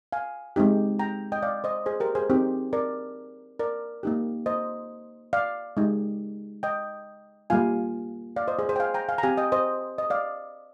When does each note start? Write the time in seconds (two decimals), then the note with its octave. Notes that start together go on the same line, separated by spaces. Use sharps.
0.12 F5 G#5
0.56 G#3 C4 D#4 G4
0.99 G5 A#5
1.32 D#5 G5
1.43 D5 F5
1.64 C5 D#5
1.86 G#4 C5
2.00 G4 A#4
2.15 G#4 C5
2.30 C4 D#4 G4
2.73 A#4 D5
3.59 A#4 D5
4.03 A#3 D#4 G4
4.46 C5 D#5
5.33 D5 F5
5.77 G#3 D#4 G4
6.63 D#5 G5
7.50 G3 A#3 F4 F5 G#5
8.36 D5 F5
8.47 C5 D#5
8.59 G#4 C5
8.69 G#4 C5
8.76 G5
8.80 F5 G#5
8.94 G5 A#5
9.09 F5 G#5
9.18 A#5
9.23 C4 G4 F5 G#5
9.38 D#5 G5
9.52 C5 D#5
9.98 D#5
10.10 D5 F5